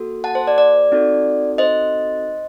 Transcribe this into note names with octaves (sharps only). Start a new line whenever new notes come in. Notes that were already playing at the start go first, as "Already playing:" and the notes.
Already playing: A#3 F#4 A4
F#5 A5
C5
D5
D5
C4 D#4 F#4 A4
C5 D#5